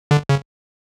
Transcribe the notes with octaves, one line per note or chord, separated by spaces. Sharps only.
D3
C#3